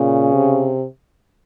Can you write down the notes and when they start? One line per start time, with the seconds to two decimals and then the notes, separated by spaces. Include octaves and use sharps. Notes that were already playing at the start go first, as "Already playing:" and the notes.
Already playing: A#2 C#3
0.34 C3